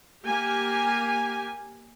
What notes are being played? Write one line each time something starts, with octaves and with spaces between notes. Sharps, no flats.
A#3 G4 G#5